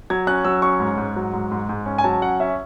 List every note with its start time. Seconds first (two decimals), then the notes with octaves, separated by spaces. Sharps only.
0.10 F#3 G#6
0.27 C#4 F#6
0.45 F#3 E6
0.62 C#4 C#6
0.80 G#2
0.97 G#2
1.16 F#3
1.33 G#2
1.51 G#2
1.69 G#2
1.86 C#4
1.98 G#5
2.04 F#3 A5
2.22 C#4 F#5
2.40 C#4 E5